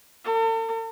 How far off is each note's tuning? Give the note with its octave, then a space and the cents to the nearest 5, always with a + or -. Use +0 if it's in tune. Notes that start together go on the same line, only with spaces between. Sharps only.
A4 +45